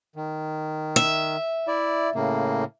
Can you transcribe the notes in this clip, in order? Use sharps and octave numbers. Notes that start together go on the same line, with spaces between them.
D#3
E5
E4 D5
A2 C#3 A#3